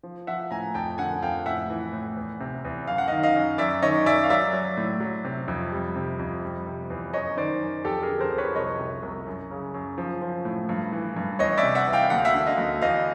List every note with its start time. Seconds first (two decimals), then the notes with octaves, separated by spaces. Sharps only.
0.03 F3
0.27 F3 E5 F#5
0.51 A2 G#5 A#5
0.74 F2 G5 A5
0.98 D3 F#5 G#5
1.22 F2 F5 G5
1.46 A2 E5 F#5
1.70 E3
1.93 A2
2.17 E2
2.40 C3
2.65 E2
2.87 F#2 F5
2.98 F#5
3.08 D#3 D#5 F5
3.23 D#5 F5
3.36 F#2
3.58 F#2 D5 E5
3.82 D#3 C#5 D#5
4.06 F#2 D5 E5
4.23 F5
4.30 F#3 D5 E5
4.53 F#3
4.77 A2
5.00 F#3
5.24 C3
5.48 F2
5.72 G3
5.96 C3
6.19 F2
6.43 G3
6.66 C3
6.90 E2
7.13 F#2 C#5 D#5
7.37 D#3 C5 D5
7.62 F#2
7.85 F2 G4 A4
8.03 G#4 A#4
8.08 D3
8.20 A#4 C5
8.32 F2
8.38 B4 C#5
8.55 C2 C#5 D#5
8.79 C3
9.03 C2
9.26 F#2
9.51 C#3
9.74 F#2
9.98 F3
10.22 F3
10.45 A2
10.69 G2
10.92 E3
11.16 G2
11.39 E2 C#5 D#5
11.58 D5 E5
11.63 C3
11.75 E5 F#5
11.87 E2
11.93 F5 G5
12.10 D2 F#5
12.18 F5
12.25 E5 F#5
12.34 D3
12.46 D#5 F5
12.58 D2
12.81 E2 D#5 F5